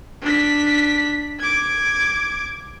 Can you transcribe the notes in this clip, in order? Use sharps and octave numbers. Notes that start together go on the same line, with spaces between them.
D4 B6
D6 G#6